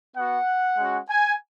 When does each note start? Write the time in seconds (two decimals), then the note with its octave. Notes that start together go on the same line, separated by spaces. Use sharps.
0.16 B3 F#4 F#5
0.77 G#3 C#4 F#4
1.07 G#5